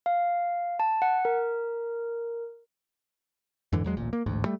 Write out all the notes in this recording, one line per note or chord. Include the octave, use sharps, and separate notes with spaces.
F5
A5
F#5
A#4
F2 G#2 D3 E3
E2 F#3 G#3
D1 A1 A#2
A#3
A1 D2 G#2
G3 A3